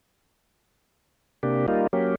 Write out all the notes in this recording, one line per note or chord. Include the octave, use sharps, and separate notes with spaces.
C3 A#3 D4 G4
G3 A#3 D#4 F4
F#3 A#3 C#4 G4